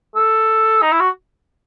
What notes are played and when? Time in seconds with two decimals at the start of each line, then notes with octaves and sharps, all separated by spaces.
0.15 A4
0.82 D#4
0.92 E4
1.00 F#4